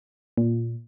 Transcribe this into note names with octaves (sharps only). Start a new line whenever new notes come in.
A#2